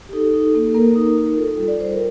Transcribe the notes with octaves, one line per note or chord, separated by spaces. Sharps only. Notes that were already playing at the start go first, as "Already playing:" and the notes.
G4
D#4 A4
D#4
A#3
A#3 A#4
D#4
D#4
F4 A4
G3
D5
G3 C5
A#4